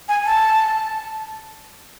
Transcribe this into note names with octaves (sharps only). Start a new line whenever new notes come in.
G#5
A5